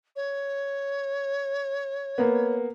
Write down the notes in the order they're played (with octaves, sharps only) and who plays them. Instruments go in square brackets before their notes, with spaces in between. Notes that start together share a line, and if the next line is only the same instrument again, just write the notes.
[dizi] C#5
[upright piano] A#3 B3